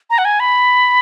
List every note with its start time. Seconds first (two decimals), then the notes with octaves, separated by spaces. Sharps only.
0.10 A#5
0.18 F#5
0.25 G#5
0.40 B5